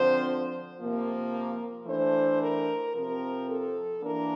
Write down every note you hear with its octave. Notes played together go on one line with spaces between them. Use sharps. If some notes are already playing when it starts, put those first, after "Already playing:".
Already playing: D3 F3 C4 C5
C3 F3 A#3
E3 A3 D4 C5
A#4
C3 F3 C4 A#4
A4
E3 A#3 D4 A#4